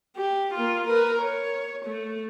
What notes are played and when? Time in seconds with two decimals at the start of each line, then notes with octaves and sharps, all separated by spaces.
0.17 G4
0.54 A#3 F4
0.88 A#4 B4
1.22 C#5
1.86 A3